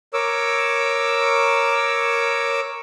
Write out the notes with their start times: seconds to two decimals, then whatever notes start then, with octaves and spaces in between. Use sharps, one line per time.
0.13 A#4 C#5 D6 E6